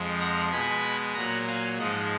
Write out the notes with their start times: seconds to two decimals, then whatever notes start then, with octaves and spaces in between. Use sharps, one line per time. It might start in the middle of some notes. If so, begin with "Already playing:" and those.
Already playing: F2 F3 G#3
0.20 F#5 A#5
0.51 B2 G#3 G#5 B5
1.15 A#2 F#3 F#5 A#5
1.47 F5 G#5
1.78 G#2 F3 G#3 D#5 F#5